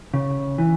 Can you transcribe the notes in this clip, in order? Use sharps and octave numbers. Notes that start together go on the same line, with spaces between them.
C#3
E3